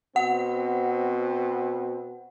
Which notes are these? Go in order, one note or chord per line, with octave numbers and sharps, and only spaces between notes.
B2 C4 F#5